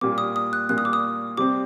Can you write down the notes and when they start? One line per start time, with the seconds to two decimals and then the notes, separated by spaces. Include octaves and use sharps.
0.01 A#2 G3 A#3 D6
0.18 D#6
0.36 D#6
0.53 F#6
0.69 A#2 G3 A#3 F#6
0.78 D#6
0.85 D6
0.93 D#6
1.37 C3 G3 C4 D6